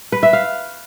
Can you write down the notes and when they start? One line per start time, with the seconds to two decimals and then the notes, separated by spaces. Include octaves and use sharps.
0.12 B4
0.23 E5
0.33 F5